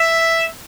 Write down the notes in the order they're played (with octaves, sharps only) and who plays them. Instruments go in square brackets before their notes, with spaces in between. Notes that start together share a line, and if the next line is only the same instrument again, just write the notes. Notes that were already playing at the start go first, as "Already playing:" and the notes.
Already playing: [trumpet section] E5